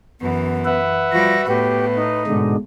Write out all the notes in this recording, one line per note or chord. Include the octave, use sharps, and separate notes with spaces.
F#2 E3 B3
B4 E5 F#5
F3 G3 F#4 A#6
A2 B3 G4 B4
D#4
G#2 B2 D3 G#3